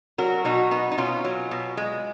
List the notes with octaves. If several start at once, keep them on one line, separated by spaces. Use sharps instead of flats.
F#3 F#4 A#4
B2 D#4 F#4
B3 D#4
D#4
B2 C#4 F4
F#3
B2
G#3